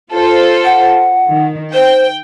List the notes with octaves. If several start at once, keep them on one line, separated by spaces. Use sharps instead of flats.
F4 A4 C5
F#5
D#3
C5 G5